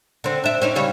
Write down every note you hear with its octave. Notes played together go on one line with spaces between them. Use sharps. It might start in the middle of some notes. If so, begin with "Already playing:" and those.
D3 C4
D4 E5
C4 C#4 D#4
C#3 G3 C#5